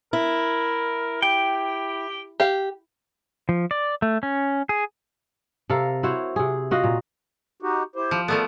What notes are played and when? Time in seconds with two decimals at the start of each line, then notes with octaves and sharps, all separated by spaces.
0.13 E4 A#4
1.22 G4 G5
2.40 G4 F5
3.49 F3
3.71 D5
4.02 A3
4.23 C#4
4.69 G#4
5.69 C3 A4 A#4 F5
6.03 E4 F#4 C5 C#5
6.36 C3 G#4
6.71 F4 F#4 D#5 F5
6.84 A#2
7.62 D#4 F#4 G4
7.96 E4 G4 C5
8.11 F3
8.28 F3 A3 B3 A4 A#4 D5